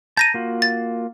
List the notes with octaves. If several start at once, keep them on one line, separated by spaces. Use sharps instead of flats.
A5 A#5 G6 A#6 D#7
A#3 F4 F#4
A6